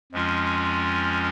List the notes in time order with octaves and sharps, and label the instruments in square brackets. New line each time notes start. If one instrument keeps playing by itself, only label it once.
[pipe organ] F2 F3 G#3 C#4 F4